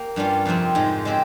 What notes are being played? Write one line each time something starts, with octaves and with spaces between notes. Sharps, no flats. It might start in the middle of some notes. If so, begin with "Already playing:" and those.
Already playing: A#3 G4
G2 G3 C#4 F4
F2 C3 F3 C4
G#2 F3 G#3
C#3 G#3 C4 G4